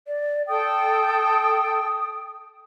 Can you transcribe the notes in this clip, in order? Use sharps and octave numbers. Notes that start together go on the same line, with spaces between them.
D5
A4 G5 D#6